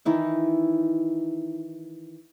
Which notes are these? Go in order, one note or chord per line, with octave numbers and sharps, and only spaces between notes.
D#3 E3 D#4 E4